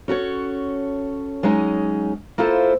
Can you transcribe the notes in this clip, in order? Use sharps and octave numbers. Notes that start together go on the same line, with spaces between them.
C#4 F#4 A4 C#5
F#3 G#3 C#4 D#4 D#5
A#3 E4 F4 A4 C5